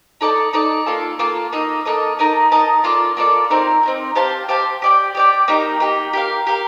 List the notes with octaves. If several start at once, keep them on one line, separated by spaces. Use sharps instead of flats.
D#4 A4 D5 A5
D#4 A4 D5 A5
A#3 F4 A4
A#3 F4 A4
A#3 D#4 A4 D#5
A#3 D#4 A4 D#5
D#4 A#4 D#5 A5
D#4 A#4 D#5 A5
A#3 F4 A4 D5
A#3 F4 A4 D5
C4 D#4 A#4
C4 D#4 A#4
G4 C5 F5 A5
G4 C5 F5 A5
G4 D5 G5
G4 D5 G5
A#3 D#4 G4
A#3 D#4 G4
G4 A#4 F5
G4 A#4 F5